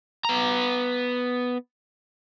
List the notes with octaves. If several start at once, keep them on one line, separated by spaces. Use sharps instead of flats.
B3 A#5